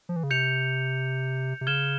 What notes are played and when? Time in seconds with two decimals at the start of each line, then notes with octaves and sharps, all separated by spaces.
0.09 F3
0.16 E3
0.23 C#3
0.31 C3 G6 C#7 F7
1.61 C3
1.67 C#3 F6 G#6 E7 G7